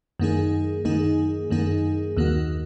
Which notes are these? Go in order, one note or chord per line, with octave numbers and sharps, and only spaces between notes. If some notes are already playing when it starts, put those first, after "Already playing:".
F#2 D#3 A#3 D#4 G#4
F#2 D#3 A#3 D#4 G#4
F#2 D#3 A#3 D#4 G#4
D#2 D#3 A#3 F#4